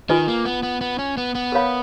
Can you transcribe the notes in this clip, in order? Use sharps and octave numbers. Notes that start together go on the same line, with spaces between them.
D#3 F4 B4 D#5 G#5
A#3
B3
B3
B3
C#4
B3
B3
A#4 C#5 F5 B5